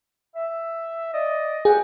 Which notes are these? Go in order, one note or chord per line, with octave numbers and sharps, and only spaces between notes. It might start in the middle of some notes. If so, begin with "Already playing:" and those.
E5
D5 D#5
G#4 D5 F#5 G5